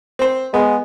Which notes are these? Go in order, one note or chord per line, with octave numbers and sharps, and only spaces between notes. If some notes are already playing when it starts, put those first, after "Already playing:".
C4 C5
G#3 B3